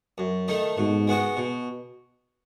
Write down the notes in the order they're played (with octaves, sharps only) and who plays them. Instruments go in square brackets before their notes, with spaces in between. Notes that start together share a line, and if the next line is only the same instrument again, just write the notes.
[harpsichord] F#2
D#3 A3 D#4
[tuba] G#2 [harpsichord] B2
[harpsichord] G#3 B3 F#4
B2